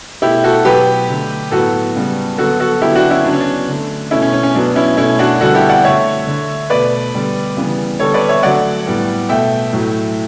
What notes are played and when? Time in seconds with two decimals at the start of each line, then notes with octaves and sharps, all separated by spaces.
0.22 B2 A3 E4 G4
0.44 F#4 A4
0.65 B2 F#3 B3 G4 B4
1.09 D3 A3
1.51 A2 F#3 B3 F#4 A4
1.95 C#3 G3 B3
2.38 D3 F#3 B3 F#4 A4
2.60 F#4 A4
2.81 D3 F#3 B3 E4 G4
2.95 D4 F#4
3.10 C#4 E4
3.24 C#3 F#3 B3 D4
3.33 C#4
3.40 D4
3.68 D3 A3
4.11 A3 C#4 E4
4.14 B2
4.22 C#4
4.33 C#4
4.43 C#4
4.55 B2 F#3 B3 D4
4.76 C#4 E4
4.97 B2 A3 C#4 E4
5.19 D4 F#4
5.41 D3 G3 B3 F#4 A4
5.55 E4 G4
5.69 D5 F#5
5.84 D3 A3 C#5 E5
6.27 D3 A3
6.70 B2 A3 B4 D5
7.14 D3 G3 B3
7.57 C#3 E3 G3 B3
8.00 D3 G3 B3 A4 C#5
8.14 B4 D5
8.29 C#5 E5
8.43 D3 F#3 A3 D5 F#5
8.87 A2 G3 B3
9.29 B2 A3 E5 G5
9.72 A2 F#3 A3